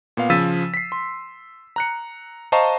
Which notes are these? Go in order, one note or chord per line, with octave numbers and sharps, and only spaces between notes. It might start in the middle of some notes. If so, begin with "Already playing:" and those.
A#2 B3 F5
C#3 F3 E6 A6 B6 D#7
B6 C7
C6
A#5 F#6 C#7
C5 D#5 F5 A5 A#5 C#6